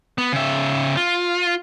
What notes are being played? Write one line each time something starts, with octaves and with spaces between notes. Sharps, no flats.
B3
C#3 E5
F4